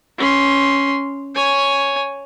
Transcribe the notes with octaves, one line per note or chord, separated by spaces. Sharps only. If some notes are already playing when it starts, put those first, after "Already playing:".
C#4 C6
C#5 G#5